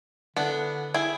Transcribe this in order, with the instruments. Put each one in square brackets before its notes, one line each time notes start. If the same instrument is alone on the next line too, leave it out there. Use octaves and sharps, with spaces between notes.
[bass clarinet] D3 [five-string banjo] B3 D4 E4
[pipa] E4 [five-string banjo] G#4 G5